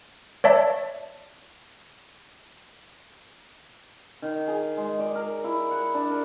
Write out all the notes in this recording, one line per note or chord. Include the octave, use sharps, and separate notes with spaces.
C#5 D5 E5 A5
D#3
G#4
G#3
D5
A#4
E4
F#5
D4
A#4